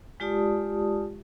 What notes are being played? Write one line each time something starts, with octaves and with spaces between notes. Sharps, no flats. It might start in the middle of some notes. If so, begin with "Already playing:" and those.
G#3 F4 G4 D5 A5 D#6